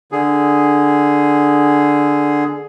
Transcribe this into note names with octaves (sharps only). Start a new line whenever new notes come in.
D3 G#4